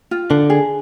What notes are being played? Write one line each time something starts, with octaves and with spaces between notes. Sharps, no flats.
F4
D3 D4
G#4